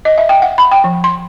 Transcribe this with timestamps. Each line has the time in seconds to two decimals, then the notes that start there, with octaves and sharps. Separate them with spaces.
0.05 D#5
0.18 E5
0.29 G5
0.42 F#5
0.58 B5
0.71 G5
0.84 F3
1.04 C6